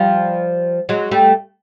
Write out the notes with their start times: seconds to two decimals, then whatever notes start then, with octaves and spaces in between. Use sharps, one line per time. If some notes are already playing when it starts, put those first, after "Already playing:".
Already playing: F3 G3
0.89 F#3 G#3
1.11 G3 A3